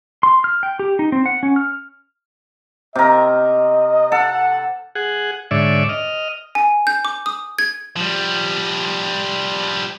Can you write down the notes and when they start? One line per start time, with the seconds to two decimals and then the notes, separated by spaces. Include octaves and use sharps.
0.23 C6
0.44 F6
0.63 G5
0.79 G4
0.99 D#4
1.12 C4
1.26 F#5
1.43 C#4
1.56 F6
2.95 C3 A#4 D#5
4.12 A4 F#5
4.95 G#4 F#5
5.51 G#2 D3 C#5 D5 E5
5.89 D#5 F6
6.55 G#5
6.87 G6
7.05 D6
7.26 D#6
7.58 G#6
7.96 F3 G3